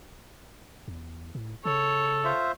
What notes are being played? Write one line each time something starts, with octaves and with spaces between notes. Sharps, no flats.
E2
A2
C#3 A4 C#5
F4 C5 E5